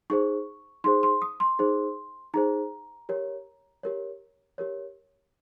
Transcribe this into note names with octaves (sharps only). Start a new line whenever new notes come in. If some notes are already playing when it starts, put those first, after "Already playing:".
D#4 G#4 C5 C#6
D#4 G#4 C5 C6
C6
D#6
C6
D#4 G#4 C5
D#4 G#4 C5 A#5
G4 A#4 C#5
G4 A#4 C#5
G4 A#4 C#5